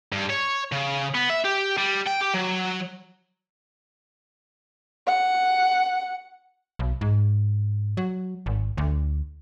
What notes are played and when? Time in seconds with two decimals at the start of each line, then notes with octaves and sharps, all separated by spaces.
0.12 G2
0.30 C#5
0.72 C#3
1.15 B3
1.30 E5
1.45 G4
1.77 G3
2.06 G5
2.21 G4
2.34 F#3
5.06 F#5
6.79 B1
7.01 G#2
7.97 F#3
8.46 G#1
8.77 D2